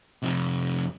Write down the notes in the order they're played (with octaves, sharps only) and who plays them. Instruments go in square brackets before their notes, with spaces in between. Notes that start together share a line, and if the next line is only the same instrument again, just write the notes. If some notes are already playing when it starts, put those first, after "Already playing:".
[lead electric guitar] F2 C3